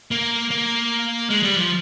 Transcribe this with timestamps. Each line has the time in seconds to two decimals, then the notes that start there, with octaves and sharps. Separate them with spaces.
0.11 A#3
0.51 A#3
1.30 G#3
1.43 G3
1.56 F3